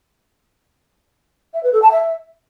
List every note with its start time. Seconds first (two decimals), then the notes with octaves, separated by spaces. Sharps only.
1.54 E5
1.63 B4
1.73 A4
1.82 A5
1.92 E5